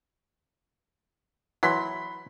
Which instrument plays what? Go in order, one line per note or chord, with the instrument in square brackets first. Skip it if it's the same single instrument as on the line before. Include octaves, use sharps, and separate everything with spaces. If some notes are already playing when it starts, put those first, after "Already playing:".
[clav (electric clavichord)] E3 F#3 [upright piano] B5 C6 B6